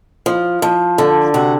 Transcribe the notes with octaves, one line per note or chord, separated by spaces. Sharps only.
F3
F3
D3
C3 F#4